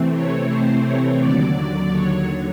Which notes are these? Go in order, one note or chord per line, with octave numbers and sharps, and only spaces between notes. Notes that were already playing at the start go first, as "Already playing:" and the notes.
Already playing: C3 E3 A3 C4
C#5
C5
C#5
D#2 D3 F#3 D5
D5
C#5